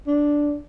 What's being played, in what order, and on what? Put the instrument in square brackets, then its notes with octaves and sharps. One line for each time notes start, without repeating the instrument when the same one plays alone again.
[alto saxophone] D4